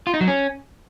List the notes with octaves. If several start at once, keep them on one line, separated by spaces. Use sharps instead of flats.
F4
D#4
F#3
C#4